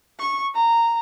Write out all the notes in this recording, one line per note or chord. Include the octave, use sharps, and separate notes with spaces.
C#6
A#5